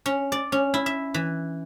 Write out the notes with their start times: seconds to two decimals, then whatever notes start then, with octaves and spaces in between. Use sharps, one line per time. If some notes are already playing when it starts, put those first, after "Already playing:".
0.06 C#4
0.32 D5
0.52 C#4
0.74 E4
0.86 E5
1.14 E3